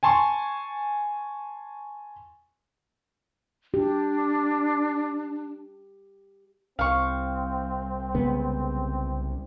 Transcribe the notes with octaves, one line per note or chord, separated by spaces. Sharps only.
G#5 A5 C6 C#6
D4 G4
C2 C4 F5 C#6
C#3 G#3 B3